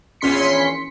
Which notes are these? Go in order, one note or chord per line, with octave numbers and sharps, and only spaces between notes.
A#1 E2 C#4 C6 B6 C#7